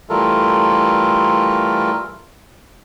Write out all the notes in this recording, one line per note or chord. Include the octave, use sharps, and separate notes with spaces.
E3 G3 A3 F4 A4 A#4